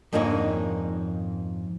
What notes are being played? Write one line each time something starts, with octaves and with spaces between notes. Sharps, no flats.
F2 G#2 A#3 D4 D#4 C#5